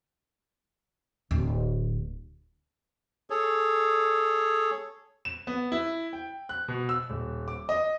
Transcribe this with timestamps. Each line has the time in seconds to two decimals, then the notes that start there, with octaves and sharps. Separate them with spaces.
1.31 D1
3.30 G#4 A4 C#5
5.25 E7
5.47 B3
5.72 E4
6.13 G5
6.49 F#6
6.68 B2
6.89 E6
7.10 D#1
7.48 D6
7.69 D#5